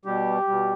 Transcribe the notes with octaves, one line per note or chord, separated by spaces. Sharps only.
B2 G3 G4
B2 G3